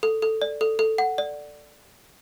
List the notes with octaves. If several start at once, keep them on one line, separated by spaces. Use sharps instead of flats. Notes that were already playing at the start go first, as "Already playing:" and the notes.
A4
A4
D5
A4
A4
F#5
D5